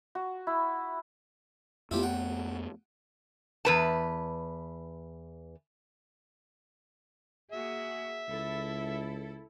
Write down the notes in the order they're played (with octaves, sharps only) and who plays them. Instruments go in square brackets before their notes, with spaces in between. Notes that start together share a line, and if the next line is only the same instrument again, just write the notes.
[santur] F#4
E4
[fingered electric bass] F2 A3 B3 [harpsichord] E4 F4 G4
[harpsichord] F#5 G5
[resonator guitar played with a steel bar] E2 B4 A5
[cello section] A#3 F#4 G#4 [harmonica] E5
[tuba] C#2 [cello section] E4 A4